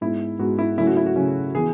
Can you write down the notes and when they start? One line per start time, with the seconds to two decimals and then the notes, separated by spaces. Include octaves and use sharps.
0.01 G#2 G#3 B3 E4
0.39 G#2 G#3 B3 F#4
0.59 E4
0.78 C#3 F#3 A3 C#4 E4
0.87 F#4
0.97 E4
1.06 F#4
1.16 C#3 F#3 A3 C#4
1.55 E3 B3 G#4